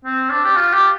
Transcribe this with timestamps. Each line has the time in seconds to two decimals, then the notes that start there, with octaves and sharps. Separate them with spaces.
0.05 C4
0.30 D4
0.45 G4
0.57 F4
0.73 G4